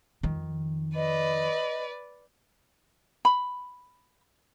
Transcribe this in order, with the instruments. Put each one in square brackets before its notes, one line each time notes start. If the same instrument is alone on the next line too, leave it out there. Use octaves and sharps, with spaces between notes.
[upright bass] F2 D#3
[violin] B4 D5 [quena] D#5
[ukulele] B5